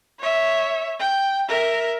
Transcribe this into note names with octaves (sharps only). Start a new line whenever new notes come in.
C#5 E5
G5
A#4 E5